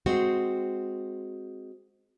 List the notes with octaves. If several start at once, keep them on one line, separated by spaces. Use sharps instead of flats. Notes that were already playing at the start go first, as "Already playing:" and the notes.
G#3 C4 F#4